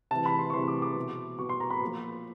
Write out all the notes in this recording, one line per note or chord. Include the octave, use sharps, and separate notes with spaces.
C3 E3 A5
B5
C6
C#6
C3 E3 C6
D6
D6
B2
B2 C#6
C6
A#5
B5
A#2 F3